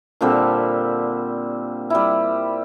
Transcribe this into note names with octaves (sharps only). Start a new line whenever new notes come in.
A#2 D3 G3 C4
G3 E4